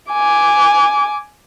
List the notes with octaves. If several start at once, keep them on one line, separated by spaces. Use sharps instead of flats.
G#5 D6